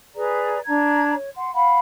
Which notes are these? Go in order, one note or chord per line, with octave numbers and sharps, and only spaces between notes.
G#4 B4 D5 A#5
D4 A#5 G#6
C#5
F#5 C6
F5 F#5 B5